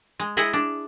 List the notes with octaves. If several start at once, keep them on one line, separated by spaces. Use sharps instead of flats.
G#3
E4 G#4 D#5 F#5
D4